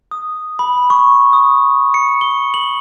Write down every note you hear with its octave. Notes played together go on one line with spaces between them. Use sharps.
D#6
B5
C#6
D#6
C#7
G7
F#7